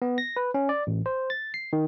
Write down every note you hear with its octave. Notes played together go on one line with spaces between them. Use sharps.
B3
A#6
B4
C#4
D5
A1
C5
A6
C7
D#3